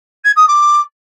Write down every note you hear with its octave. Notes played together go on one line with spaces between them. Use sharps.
G#6
D#6
D6